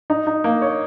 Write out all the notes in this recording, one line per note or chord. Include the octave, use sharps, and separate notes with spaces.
D#4
D#4
A#3
C#5